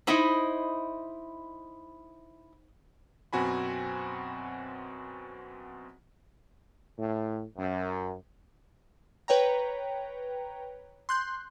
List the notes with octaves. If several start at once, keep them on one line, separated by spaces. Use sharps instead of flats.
D#4 E4 C5 D#5 B5
F#2 B2 C4 F#4 G#5 B5
A2
F#2
B4 C#5 G5 A#5
C6 F#6 G6